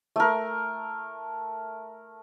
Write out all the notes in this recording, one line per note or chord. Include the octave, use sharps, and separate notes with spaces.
A3 A#4